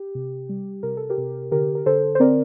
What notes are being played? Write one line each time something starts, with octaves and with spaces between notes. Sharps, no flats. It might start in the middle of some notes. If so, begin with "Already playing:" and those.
Already playing: G4
C3
G3
C3 A#4
A4
G4 A#4
C3
D3 G4 A#4
A#4
D3 A4 C5
C5
C4 A#4 D5